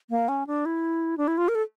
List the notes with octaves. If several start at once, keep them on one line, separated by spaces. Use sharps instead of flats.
A#3
C#4
D4
E4
D4
E4
F4
A#4
A4